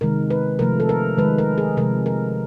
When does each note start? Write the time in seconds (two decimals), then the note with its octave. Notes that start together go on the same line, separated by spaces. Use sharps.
0.01 C3 D#3 G#3 A#4
0.30 B4
0.59 C3 F3 A3 A#4
0.80 A4
0.89 A#4
1.18 D#3 G#3 B4
1.38 A#4
1.58 G#4
1.77 C3 F3 G#3 A#4
2.06 A#4